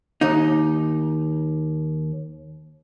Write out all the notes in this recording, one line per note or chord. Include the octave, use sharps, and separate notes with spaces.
D#2 D#4